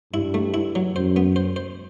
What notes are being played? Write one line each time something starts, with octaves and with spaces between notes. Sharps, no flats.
G2 E4
A3
E4
F#3
F#2 C5
B3
C5
C5